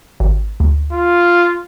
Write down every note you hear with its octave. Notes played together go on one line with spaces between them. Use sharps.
G#1
D2
F4